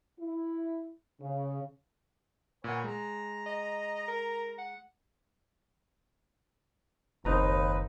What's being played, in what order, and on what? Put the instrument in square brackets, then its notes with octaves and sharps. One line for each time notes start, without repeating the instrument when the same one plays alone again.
[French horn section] E4
C#3
[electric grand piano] A#2 F#5 [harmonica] B4 C#5 G#5
[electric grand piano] G#3 [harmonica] A#5
[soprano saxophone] D#5
A#4
F#5
[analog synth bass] F#1 [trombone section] D#2 [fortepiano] C4 D#4 A#5 [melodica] B4